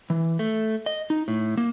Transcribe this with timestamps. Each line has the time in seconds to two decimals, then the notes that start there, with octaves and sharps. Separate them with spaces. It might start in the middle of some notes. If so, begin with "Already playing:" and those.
0.10 E3
0.39 A3
0.86 D#5
1.10 D#4
1.28 A2
1.57 A#3